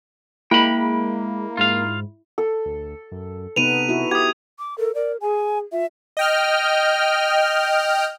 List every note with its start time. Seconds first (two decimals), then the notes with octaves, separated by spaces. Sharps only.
0.51 G#3 A#3 E4 G5 B5
1.57 G#2 F4 F5
2.38 A4
2.66 D2
3.12 F#2
3.56 C3 B3 D#4 B4 D#7 F7
3.89 E4 F#4
4.11 G4 D#6 G#6
4.59 D6
4.78 A4 A#4
4.95 A#4 D5
5.22 G#4 G#5
5.72 F4 E5
6.17 D#5 G5 F6